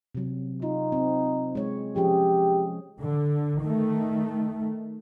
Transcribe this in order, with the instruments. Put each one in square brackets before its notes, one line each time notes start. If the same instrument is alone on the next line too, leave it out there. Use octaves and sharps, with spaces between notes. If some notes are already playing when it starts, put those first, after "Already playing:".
[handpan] C3 F#3
[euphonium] D#4 [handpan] F4
[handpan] C4
G#3 C#5
[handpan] F3 C#4 G#4 [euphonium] G4
[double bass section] D3
D#3 A3